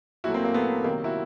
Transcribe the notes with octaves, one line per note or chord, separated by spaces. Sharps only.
A#2 F#3 A3 E4 F#4
A#3 C4
A#3
A3 B3
C3 D#3 F#3 A#3 C4
E4 F#4